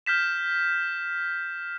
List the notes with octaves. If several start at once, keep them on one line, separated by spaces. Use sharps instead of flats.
F6 G6 B6 E7